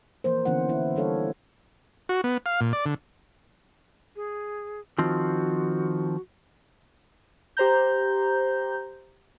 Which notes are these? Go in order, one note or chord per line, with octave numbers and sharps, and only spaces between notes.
E3 F3 A#3 A#4 C5
D3 E3 B3 C#4 E4 F#5
E4
G3 D4 A4 C#5 F5
F#4
B3
F5
A#2
D5
D3
G#4
D#3 F3 C4 F#4
G4 C5 A#5 G6